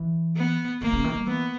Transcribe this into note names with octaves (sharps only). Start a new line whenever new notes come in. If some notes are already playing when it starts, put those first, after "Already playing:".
Already playing: E3
B3
D#3 A#3
C#3
D#3
G3
E3 B3